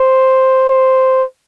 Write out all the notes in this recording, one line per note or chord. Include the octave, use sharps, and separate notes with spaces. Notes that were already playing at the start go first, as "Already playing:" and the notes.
Already playing: C5
C5